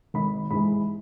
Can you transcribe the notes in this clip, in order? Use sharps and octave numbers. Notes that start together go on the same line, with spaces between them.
G#1 B5
G#2 E3 G#3 B5